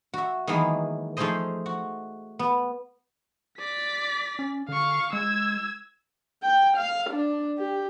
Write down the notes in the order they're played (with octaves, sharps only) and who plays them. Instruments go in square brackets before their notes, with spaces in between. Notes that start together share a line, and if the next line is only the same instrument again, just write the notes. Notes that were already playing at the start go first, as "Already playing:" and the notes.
[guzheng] F#4 E5
D#3 E3 F#3 G#3 A#3 B3
F3 A3 D#4 G#4 C5 D#5
F#4
B3
[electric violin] D5 B6
[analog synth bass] C#4
[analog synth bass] D3 [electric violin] F5 C#6
[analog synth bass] G#3 [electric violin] E6 G#6
[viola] G5
F5
D4
G4